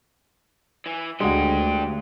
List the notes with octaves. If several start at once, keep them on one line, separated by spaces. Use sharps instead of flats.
E3
D2 G#3 D4 F#4 G4